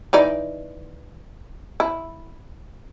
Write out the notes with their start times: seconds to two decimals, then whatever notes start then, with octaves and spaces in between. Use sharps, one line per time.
0.13 E3 D#4 D5
1.80 E4